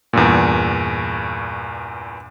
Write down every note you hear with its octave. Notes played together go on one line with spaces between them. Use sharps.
E2 G2 A#2